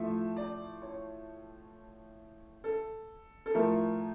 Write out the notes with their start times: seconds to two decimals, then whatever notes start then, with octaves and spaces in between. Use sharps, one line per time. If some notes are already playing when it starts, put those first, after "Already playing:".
Already playing: A2 F3 A3 E5
0.37 D5
0.82 C#5
2.64 A4
3.46 A4
3.54 A2 F3 A3 A#4